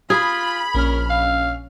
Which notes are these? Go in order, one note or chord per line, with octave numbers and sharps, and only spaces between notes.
F4 G#4 B5
A#1 C#4 A#4 F6
F5